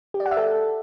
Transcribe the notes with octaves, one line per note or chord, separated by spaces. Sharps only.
G4
D5
F#5
E5
A4